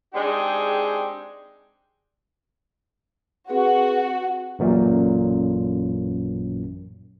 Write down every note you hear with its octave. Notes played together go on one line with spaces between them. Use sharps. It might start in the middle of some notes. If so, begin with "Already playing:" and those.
G#3 C4 D4 D#4 G4 G#4
C4 F#4 G#4 B4
A1 F#2 A#2